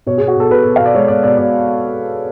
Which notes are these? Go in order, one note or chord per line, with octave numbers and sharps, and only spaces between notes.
B2 C#5
G#4
B2
F#4
B2 A4
B2 B4
B2
B2 F5
D5
G#3 C#5
B2 D5
B2 D5
B2 D5